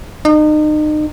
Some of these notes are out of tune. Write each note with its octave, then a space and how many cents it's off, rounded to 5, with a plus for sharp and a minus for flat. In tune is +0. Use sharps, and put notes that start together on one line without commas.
D#4 -35